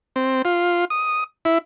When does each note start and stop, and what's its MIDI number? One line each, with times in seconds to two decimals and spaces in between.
0.16 0.42 60
0.45 0.85 65
0.90 1.24 87
1.45 1.58 64